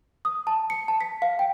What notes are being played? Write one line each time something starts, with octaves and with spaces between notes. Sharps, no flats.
D#6
A5
C#7
A5
B6
F5
G5